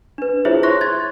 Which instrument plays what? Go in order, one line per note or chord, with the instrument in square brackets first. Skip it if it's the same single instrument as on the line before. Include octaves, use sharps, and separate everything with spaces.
[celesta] D4 B4
E4 F4 G#4 C5 C#5 E5
C6 C#6 F#6 A#6
C6 G#6 A6